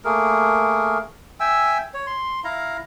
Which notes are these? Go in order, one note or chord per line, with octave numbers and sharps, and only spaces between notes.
A3 A#3 G#4 A#4
E5 G5 G#5 E6
C#5
C6
E4 F5 A#5